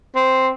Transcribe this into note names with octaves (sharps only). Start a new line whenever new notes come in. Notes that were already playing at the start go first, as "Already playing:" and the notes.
C4